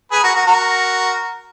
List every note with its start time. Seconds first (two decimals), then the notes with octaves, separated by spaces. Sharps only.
0.11 G#4 B4
0.23 F#4 A#4
0.35 F#4 A#4
0.47 F#4 A#4